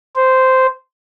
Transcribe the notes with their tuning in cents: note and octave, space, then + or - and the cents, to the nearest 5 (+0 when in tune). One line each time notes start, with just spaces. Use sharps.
C5 -10